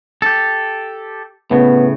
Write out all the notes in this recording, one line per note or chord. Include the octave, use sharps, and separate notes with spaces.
G4 A4
A2 C#3 B3